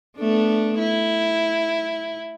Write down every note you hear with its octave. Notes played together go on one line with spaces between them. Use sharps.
A3 B3 D4
E4